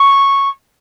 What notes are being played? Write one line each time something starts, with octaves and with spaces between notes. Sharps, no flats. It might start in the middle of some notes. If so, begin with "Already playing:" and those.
Already playing: C#6